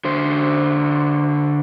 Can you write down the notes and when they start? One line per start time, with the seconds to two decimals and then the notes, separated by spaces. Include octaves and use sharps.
0.05 D3 C5